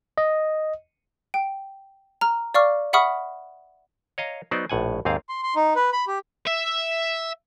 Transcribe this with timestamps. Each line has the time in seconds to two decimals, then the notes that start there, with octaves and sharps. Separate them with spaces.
0.18 D#5
1.34 G5
2.21 A#5 F6
2.54 D5 F5 C#6 D6 F6
2.93 E5 F#5 B5 C#6 D#6 F6
4.18 C#5 D#5 F5 A#5
4.51 F#3 B3 D#4 C5 D5
4.70 A#1 A2 F#5 G#5
5.05 D#2 G#2 C4 G#4 F5
5.29 C6
5.43 C6
5.56 D#4
5.76 B4
5.93 B5
6.07 G4
6.47 E5